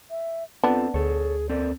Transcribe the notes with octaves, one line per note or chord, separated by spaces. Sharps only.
E5
B3 C4 D4 F4 A4
D2 G#4 A4 C#5
C4 A4 A#4 D5